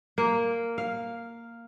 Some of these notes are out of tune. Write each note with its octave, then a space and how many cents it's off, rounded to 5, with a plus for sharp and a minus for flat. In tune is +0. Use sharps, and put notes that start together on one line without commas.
A#3 -5
F5 +0